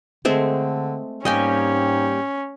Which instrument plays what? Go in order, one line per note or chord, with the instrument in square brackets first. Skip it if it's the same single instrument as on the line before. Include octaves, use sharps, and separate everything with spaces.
[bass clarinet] D3 [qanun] G#3 A3 C4
[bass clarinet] G#2 [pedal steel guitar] G3 A#3 G4 [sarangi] C#4 [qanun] D#5 G5 G#5